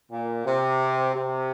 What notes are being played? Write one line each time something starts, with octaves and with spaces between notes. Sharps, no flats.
A#2
C3
C3